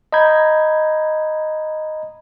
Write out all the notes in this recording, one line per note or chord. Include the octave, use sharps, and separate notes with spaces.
D#5 A#5 B5 G6 G#6